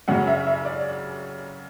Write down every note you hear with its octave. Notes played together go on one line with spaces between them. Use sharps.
F#2 C#3 F#3 F#5
E5
E5
D5